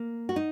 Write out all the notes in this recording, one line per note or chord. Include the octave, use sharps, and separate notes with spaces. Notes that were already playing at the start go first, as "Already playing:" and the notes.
Already playing: A#3
F#4
D#4